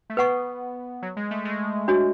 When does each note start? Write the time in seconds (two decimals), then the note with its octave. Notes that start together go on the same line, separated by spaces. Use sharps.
0.10 A3
0.17 B3 B4 F#5 C#6
1.02 F#3
1.17 G#3
1.31 A3
1.45 G#3
1.88 D4 F#4 C#5